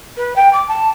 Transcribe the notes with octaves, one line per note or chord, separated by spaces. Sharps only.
B4
G5
D6
A5